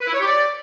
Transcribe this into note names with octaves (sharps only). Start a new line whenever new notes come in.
B4
E4
C#5
G4
D5